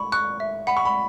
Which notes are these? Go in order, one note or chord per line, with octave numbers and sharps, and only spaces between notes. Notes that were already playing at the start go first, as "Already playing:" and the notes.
Already playing: B5 C#6
C#6 F#6
E5
F#5 B5
C#6
B5